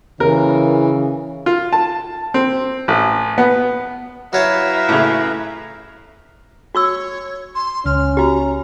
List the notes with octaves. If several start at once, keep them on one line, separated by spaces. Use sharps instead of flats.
C#3 E3 A#4
F4
A5
C4
A1
B3
F#3 E4 B4 C#5 E5 F5 A5 A#5
A2 C#3
F#4 C#5 C#6 E6
C6
C#2 C#4 F6
F#4 G4 A#5